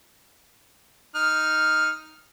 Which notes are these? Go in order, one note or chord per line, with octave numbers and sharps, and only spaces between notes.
D#4 F6